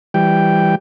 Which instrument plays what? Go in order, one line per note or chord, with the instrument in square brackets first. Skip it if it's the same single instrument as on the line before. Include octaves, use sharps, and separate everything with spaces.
[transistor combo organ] E3 G3 G5